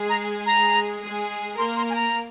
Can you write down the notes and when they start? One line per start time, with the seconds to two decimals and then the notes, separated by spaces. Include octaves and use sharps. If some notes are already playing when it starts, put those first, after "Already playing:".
Already playing: G#3 G#4
0.09 A#5
0.46 A#5
1.02 G#3 G#4
1.58 A#3 A#4 C6
1.77 C6
1.90 G#5
1.95 A#5